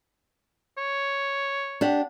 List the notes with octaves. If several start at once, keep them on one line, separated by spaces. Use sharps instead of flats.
C#5
D4 G4 F#5